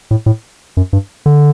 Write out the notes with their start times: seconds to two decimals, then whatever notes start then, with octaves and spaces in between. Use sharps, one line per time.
0.11 A2
0.26 A2
0.77 F#2
0.93 G2
1.26 D3